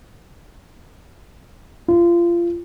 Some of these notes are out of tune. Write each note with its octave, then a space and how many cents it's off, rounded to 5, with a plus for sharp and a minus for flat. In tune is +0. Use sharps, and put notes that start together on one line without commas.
F4 -25